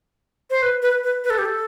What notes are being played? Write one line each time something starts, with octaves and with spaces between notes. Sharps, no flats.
C5
B4
B4
B4
B4
A4
G4
A4